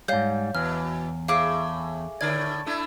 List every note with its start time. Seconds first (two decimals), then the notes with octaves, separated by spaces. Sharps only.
0.08 G#2 G3 C#5 F5 G6
0.55 E2 B2 E3 F6
1.28 A2 G#4 E5 F5 D6
2.21 A2 D3 D5 G#6
2.66 A3 D4 E4